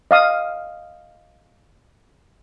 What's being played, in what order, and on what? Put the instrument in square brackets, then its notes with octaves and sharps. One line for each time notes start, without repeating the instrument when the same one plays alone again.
[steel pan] D#5 F5 D#6